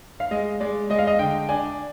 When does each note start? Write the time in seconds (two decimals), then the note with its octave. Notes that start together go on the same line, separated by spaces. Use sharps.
0.20 F5
0.31 G#3 D#5
0.60 G#3 D5
0.90 G#3 D#5
0.99 F5
1.07 D#5
1.19 D3 G5
1.49 D4 G#5